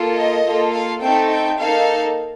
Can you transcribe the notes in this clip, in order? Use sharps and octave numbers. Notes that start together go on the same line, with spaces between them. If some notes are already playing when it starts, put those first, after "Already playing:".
Already playing: A#3 F4 A4
D#5
A#3 F4 A4
F5
A3 C4 D#4 A4 G5
G5
A#3 D#4 A4 F5